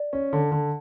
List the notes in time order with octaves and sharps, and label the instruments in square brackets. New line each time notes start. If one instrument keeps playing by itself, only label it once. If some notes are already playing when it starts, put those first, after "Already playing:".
Already playing: [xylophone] D5
[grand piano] C#4
D3
D3